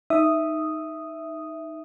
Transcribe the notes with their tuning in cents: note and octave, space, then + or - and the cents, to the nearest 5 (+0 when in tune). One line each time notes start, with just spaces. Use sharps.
D#4 +0 E5 +0 D#6 +0